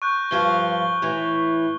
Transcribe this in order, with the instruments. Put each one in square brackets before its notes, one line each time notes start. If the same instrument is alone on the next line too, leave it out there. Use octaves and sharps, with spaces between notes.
[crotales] C#6 F#6 G6
[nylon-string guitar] G2 F3 [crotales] G7
[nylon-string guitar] A2 E3